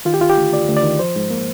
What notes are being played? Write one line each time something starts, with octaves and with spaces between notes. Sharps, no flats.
D#3 F4
G4
D2 F4
G4
D2
D2 D5
D2
D5
D#3
F3 C5
G#2
A#3